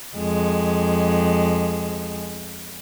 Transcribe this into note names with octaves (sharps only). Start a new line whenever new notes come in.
F2 G#3